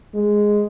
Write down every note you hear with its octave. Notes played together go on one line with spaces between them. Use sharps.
G#3